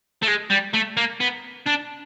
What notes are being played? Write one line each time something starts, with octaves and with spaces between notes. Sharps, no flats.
A3
G#3
G3
A3
A#3
B3
D4